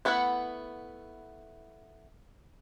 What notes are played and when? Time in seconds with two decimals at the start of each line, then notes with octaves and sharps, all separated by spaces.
0.05 A3 B3 E4 B4 F#5